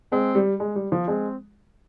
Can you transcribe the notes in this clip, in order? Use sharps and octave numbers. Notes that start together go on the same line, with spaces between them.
G#3 C4
G3
G#3
G3
F3
G#3 C4